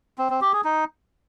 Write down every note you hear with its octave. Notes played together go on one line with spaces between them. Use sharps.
C4
C4
G4
G#4
D#4